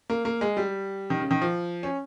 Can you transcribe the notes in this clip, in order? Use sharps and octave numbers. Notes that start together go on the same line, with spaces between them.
A#3
A#3
G#3
G3
D#3
C#3
D#3
F3
C#4